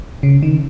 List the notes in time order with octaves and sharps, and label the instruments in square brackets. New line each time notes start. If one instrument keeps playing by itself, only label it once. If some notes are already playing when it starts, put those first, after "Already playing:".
[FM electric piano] C#3
D#3